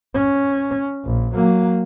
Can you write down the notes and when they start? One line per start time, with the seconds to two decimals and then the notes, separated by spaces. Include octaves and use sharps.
0.15 C#4
1.05 A#1
1.34 F#3 A#3